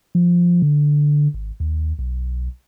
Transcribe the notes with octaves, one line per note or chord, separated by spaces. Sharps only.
F3
D3
G#1
D#2
B1